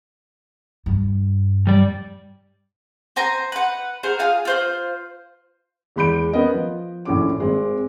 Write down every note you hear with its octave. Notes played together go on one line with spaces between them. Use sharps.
G2
G3 D5
C5 G#5 A#5 C6
B4 F#5
G#4 A#4 C5 F#5
F4 G#4 F5 G#5
F4 C5 F#6
E2 G#3 B5 G6 D7
B3 C#4 A#4 B4 D#5
F3
A#1 A2 C#4 D6
G#1 G#3 C4